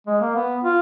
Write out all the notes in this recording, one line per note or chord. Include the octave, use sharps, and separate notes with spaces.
G#3
A#3
B3
F4